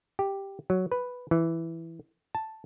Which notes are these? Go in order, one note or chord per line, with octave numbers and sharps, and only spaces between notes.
G4
F#3
B4
E3
A5